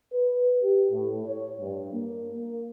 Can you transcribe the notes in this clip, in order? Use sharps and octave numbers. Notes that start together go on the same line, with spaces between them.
B4
G4
A2
C#5
G2
A#3
A#3